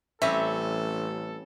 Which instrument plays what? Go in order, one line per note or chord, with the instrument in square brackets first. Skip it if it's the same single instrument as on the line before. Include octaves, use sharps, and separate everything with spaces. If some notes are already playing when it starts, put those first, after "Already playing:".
[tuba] A1 [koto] G3 C4 C#4 [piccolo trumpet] A4 [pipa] E5